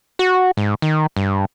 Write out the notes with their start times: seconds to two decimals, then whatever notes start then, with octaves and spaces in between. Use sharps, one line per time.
0.19 F#4
0.57 G#2
0.82 D#3
1.17 G2